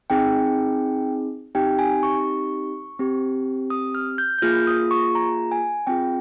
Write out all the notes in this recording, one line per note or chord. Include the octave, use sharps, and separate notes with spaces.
C4 D#4 G#4 G5
C4 D#4 G4 G5
G#5
C#6
C4 G4
D#6
F6
G6
G6
A#3 F4 G#4 F6
D#6
C#6
A#5
G#5
C4 F4 G#4 G5